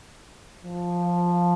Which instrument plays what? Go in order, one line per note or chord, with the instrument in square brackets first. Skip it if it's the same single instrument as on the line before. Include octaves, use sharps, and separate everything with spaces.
[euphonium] F3